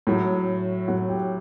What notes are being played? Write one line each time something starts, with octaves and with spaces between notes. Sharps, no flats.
A2 F#3
A2 F#3 F#4 F#5
G4 G5